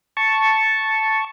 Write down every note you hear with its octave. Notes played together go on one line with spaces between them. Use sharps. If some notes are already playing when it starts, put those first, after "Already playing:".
A5 C#6